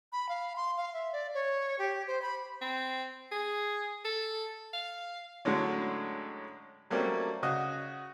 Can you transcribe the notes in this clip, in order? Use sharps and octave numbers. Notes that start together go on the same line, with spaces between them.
B5
F5
C6
F5
E5
D5
C#5
G4
C5
B5
C4
G#4
A4
F5
A2 D3 F#3 G#3 C#4
F#3 G3 A3 A#3 C4 C#4
C#3 F#4 D#5